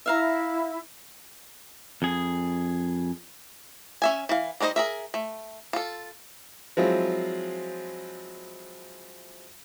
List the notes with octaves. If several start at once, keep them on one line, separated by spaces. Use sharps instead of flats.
E4 E5 F5 A#5
F2 G#4
C#4 E5 G#5
E3 F5
G3 D4 D#4 C5 D#5
G#4 A#4 E5
A3
F4 A4
F3 F#3 G#3 C4 E4 F4